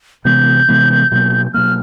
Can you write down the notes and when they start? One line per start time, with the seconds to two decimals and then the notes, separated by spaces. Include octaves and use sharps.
0.25 C3 E3 G#3 B3 G6
0.68 C3 E3 G#3 B3
1.12 B2 F#3 A#3
1.54 B2 F#3 A#3 F6